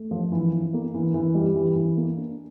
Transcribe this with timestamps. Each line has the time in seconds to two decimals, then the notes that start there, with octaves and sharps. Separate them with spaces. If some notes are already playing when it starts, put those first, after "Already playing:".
Already playing: A3
0.11 F3
0.32 E3
0.53 E3
0.73 A#3
0.94 E3
1.14 E3
1.35 G3
1.56 E3
1.76 E3
1.97 A#3
2.17 D4